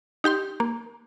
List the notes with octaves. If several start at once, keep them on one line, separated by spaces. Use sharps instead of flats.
D#4 G4 G5 C6
A#3